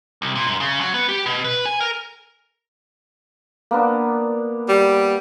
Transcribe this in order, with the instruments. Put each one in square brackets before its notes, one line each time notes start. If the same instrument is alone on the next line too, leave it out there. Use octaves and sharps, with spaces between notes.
[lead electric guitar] C2
A#2
F#2
C#3
F#3
B3
G4
B2
B4
G#5
A#4
[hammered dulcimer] A#3 B3 D4
[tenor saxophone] G3